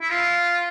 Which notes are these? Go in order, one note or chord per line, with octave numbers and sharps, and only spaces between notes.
E4
F4